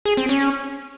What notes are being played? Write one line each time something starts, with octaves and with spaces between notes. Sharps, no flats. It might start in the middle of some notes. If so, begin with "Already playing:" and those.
G#4
C4
C#4